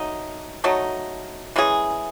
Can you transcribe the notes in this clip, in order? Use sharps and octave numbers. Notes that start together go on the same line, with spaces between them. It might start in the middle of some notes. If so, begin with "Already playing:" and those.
Already playing: F#3 A3 D#4
F#3 A3 D#4
E3 G#3 C#4 G#4